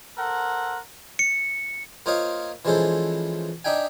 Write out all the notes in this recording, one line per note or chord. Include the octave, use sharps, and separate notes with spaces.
A4 A#4 C5 F#5
C#7
A#3 F4 C5 C#5 D#5 F5
E3 F3 G#3 C#4 A4 C5
D4 D#4 E5 G5 G#5